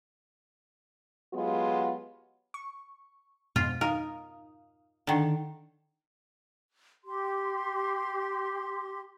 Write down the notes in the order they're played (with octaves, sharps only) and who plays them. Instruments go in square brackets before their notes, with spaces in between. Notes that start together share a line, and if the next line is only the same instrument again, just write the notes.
[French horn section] F#3 G#3 B3 F4 G4
[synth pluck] C#6
[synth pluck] F2 G#2 B2 [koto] F4
[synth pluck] D#4 F5 D#6 [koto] A#4
[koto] D3 D#3
[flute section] G4 C6